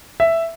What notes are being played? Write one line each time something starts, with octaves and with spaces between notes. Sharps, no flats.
E5